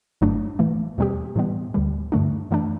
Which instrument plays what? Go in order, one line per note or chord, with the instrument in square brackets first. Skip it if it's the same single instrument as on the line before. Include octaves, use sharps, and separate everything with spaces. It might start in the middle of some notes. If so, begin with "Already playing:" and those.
[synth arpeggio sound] G1 G2 F#3 A3 D4
A2 E3 A3
E2 B2 G3 C4 G4
A2 E3 G3 B3
D2 D3 G3
G2 D3 A3 D4
F#2 E3 A3 D4